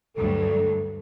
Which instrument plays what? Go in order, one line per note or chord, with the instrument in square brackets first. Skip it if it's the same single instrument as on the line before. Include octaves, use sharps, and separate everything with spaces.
[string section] D2 G2 F#3 [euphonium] A4